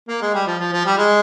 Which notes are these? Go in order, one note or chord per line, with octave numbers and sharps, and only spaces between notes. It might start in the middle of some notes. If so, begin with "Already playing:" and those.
A#3
G#3
G3
F3
F3
F3
G3
G#3